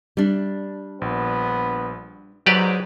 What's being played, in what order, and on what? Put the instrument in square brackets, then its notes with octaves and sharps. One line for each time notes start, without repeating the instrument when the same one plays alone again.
[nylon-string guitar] G3 D4
[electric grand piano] A#1 [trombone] B3
[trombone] G#2 [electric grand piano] F#3 [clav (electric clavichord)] G4 B4 D5